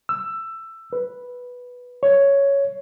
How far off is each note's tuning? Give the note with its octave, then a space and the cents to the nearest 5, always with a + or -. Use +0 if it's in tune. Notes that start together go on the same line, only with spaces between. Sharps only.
E6 +15
B4 -5
C#5 +5